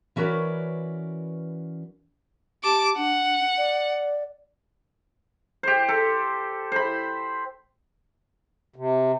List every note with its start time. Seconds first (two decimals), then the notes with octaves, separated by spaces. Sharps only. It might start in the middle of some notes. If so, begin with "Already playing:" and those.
0.16 E3 C#4 F#4 A#4 B4 D5
2.64 G4 A5 D6
2.97 D4 F#5
3.58 D5
5.63 G4 C5
5.89 A4
6.72 C5 B5
8.76 C3